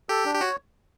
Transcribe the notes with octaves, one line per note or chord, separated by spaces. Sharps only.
G4 A4
D4
G4
F#4 C#5